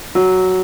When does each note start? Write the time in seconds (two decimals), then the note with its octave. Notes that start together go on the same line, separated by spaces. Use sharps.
0.15 F#3